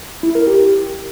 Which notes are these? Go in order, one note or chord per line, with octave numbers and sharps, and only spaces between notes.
E4
A#4
G4